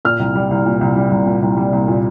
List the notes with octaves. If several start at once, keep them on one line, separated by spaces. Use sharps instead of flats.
A#2 F6
C2
G3
C2
A#2
C2
G3
C2
A#2
C2
G3
C2
A#2